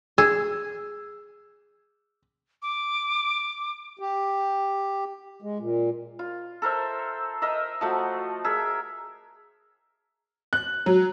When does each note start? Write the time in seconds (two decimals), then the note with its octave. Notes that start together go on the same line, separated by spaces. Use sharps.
0.18 G#4 E6
2.62 D6
3.99 G4
5.42 G#3
5.59 A#2
6.19 F4
6.62 A4 A#4 C5 E5
7.42 A#4 D#5 E5
7.81 F3 A3 F#4
8.44 G#4 A#4 E5
10.53 F#6
10.86 F#3